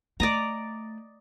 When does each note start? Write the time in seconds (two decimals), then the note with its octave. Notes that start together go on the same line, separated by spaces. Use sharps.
0.20 A3 D5 D#5 A#5